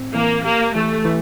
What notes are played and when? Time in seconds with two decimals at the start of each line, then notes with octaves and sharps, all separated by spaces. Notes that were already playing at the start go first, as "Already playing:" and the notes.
Already playing: A2 C4
0.15 E3 A#3
0.44 A#3 G4
0.75 E3 A3
1.05 E3